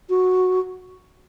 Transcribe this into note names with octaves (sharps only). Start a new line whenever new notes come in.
F#4